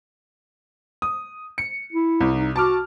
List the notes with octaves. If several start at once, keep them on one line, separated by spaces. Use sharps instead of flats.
D#6
C#7
E4
C2
D#4
F#4 A5 D6 F6